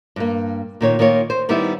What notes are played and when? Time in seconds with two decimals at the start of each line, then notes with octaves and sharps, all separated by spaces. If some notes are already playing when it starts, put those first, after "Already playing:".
0.16 G2 A#3
0.81 A#2 D#3 C#5
0.99 D#3 A#3 F4 C#5
1.30 C5
1.49 D#3 G3 B3 D#4 E4